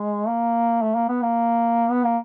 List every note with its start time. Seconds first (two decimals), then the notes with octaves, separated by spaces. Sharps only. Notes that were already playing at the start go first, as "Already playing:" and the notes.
Already playing: G#3
0.28 A#3
0.82 A3
0.95 A#3
1.09 B3
1.22 A#3
1.90 B3
2.04 A#3